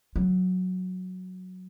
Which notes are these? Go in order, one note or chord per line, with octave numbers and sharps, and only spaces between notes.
F#3